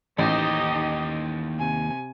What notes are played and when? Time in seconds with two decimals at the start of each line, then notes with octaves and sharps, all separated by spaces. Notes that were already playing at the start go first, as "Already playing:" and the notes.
0.18 A1 D#2 D#4 G4 C5 D#5
1.57 C3 G#5